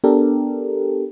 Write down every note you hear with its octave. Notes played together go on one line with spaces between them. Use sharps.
B3 D4 G4 A4 A#4